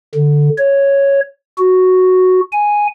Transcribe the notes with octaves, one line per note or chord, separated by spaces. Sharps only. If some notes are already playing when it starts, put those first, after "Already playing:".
D3
C#5
F#4
G#5